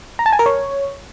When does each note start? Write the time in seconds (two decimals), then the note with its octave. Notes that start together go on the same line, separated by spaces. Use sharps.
0.19 A#5
0.26 A5
0.32 G#5
0.39 A#4
0.46 C#5